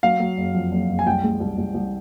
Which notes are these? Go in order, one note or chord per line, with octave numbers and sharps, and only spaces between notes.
F#3 F5
F#3
F#1
F2
F#1
F#1
G#5
C2 G5
G#3
C2
C2
C2